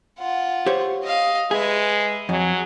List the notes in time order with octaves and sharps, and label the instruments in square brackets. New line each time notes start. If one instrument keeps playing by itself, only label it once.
[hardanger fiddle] F4 F#5
[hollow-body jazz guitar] G4 C5 C#5
[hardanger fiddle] D#5 F5
[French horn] G#3 [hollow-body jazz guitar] G#4 [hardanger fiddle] B4 E5
[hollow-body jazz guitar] F2 [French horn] F#3 [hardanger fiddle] G#4